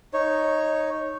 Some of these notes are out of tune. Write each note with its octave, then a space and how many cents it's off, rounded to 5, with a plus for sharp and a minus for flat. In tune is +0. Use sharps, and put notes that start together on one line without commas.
D#4 +0 C#5 -10